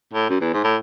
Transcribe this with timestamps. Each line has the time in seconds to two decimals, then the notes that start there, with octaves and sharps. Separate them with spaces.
0.13 A2
0.30 F#2
0.41 E2
0.53 G#2
0.64 A2